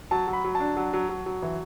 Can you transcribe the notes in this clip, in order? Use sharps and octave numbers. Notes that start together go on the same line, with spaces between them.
F#3 A5
F#3
B5
F#3
A5
D4
F#3
F#3
F#3
F#3
E3